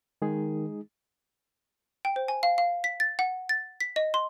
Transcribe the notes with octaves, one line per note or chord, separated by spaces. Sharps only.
D#3 G#3 D#4 G#4
G5
C5
G#5
F5
F5
B6
A6
F#5
A6
B6
D#5
C6